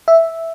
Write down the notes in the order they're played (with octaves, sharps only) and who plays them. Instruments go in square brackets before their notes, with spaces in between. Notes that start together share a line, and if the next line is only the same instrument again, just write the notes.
[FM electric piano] E5